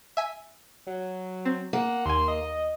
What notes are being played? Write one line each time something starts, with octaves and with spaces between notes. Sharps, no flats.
E5 G#5 B6
F#3
C4
A#3 F#5
D#2 G#5 C6
D#5